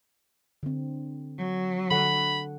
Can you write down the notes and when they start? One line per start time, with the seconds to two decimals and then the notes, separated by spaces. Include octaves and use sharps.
0.63 D3 C4
1.39 F#3
1.91 D3 A4 F#5 B5